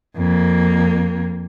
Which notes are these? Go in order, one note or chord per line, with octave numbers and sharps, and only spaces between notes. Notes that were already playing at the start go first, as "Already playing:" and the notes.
F2 A#3